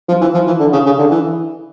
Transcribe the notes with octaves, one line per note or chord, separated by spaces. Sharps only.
F3
E3
F3
E3
D3
C#3
C#3
D3
E3